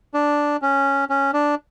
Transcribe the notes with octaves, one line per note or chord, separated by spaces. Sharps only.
D4
C#4
C#4
D4